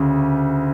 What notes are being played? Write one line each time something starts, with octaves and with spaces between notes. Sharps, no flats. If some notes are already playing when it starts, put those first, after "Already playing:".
Already playing: D2 C#3